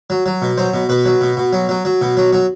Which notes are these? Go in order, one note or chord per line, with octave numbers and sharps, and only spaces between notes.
F#3
F#3
B2
F#3 C5
B2
B2 B4
F#3
B2
B2
F#3
F#3
F#3
B2
F#3
F#3